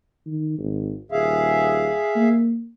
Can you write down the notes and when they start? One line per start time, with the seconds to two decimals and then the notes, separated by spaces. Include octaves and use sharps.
0.26 D#3
0.58 G#1
1.12 D#1 G#4 E5 F5
2.16 A#3